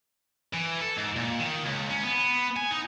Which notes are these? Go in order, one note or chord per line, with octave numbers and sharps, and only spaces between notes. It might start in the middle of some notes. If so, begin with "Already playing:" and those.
E3
A4
G#2
A#2
D#3
C#2
C#4
B3
G#5
D#4